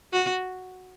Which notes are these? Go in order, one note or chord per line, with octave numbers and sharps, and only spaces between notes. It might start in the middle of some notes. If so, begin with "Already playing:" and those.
F#4